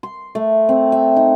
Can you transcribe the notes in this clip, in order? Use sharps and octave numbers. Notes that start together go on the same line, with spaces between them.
C6
A3
C4
E5
D#4